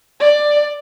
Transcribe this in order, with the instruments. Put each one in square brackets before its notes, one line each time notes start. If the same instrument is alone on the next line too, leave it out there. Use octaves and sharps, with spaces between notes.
[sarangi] D5